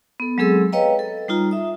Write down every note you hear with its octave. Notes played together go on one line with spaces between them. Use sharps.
B3 A4
F#3 G#3 C4 G#4 A4 E6
B4 C#5 D#5 F5 G5 A#5
A4
G3 D#4 F4 A#5
E5 D#6